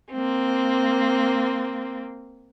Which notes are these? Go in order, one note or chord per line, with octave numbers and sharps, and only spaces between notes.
A#3 C4